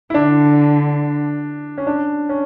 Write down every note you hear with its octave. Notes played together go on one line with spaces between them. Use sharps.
E4
D3 D4
C#4
D4
C#4